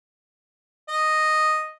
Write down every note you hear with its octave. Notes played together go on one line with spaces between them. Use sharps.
D#5